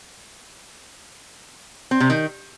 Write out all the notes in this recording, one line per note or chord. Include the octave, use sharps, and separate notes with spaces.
C4
C3
D#3